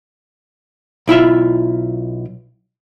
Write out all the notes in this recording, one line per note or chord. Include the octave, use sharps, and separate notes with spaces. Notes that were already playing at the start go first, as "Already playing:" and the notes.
B1 E4 F4 E5